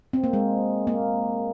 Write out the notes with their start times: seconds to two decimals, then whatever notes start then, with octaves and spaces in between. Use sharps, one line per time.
0.13 C4
0.24 A#3
0.33 G#3
0.87 A#3